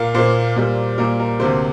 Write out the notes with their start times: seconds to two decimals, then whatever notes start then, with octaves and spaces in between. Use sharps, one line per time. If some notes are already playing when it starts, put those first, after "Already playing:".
Already playing: A#2 A#3 F5
0.14 A#2 A#3 C5
0.56 A#2 G3 A#3
0.98 A#2 G3 A#3 A#4
1.20 A#4
1.40 D2 C3 A#3 C5